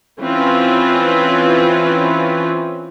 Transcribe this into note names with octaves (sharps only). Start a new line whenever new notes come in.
E3 C4 C#4 E4 F4 B4